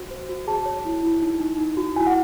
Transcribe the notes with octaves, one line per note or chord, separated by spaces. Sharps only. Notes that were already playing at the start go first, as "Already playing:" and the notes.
Already playing: F#4 C5
C5
F#4
G#4 A5
C#5
E4
E4
D#4
D#4
D#4
F#4
E4 G#5
F#5